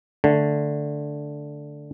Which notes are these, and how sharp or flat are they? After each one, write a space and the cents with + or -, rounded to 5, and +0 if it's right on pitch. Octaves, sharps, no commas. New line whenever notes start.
D3 +0 A3 +0